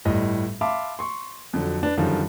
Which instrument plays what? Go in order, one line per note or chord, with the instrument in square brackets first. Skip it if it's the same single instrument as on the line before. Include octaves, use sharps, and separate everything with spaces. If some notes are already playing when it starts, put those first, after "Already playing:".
[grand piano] G1 A2 G3 D#5
E5 F5 A5 B5 C6 D6
C6 C#6
F2 D3 F#3
D4 B4
F#2 D3 D#3 F3 G3